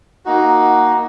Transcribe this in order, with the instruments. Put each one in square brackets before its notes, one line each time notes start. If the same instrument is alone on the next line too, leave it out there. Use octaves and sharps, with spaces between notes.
[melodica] A#3 D#4 F#4